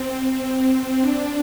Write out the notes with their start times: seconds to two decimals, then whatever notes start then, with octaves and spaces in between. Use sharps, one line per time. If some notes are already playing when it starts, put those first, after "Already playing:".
Already playing: C4
0.11 C4
1.01 D4